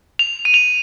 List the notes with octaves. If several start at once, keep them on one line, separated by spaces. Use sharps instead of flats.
F7
D#7
F7